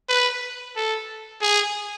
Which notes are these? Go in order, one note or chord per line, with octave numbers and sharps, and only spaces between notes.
B4
A4
G#4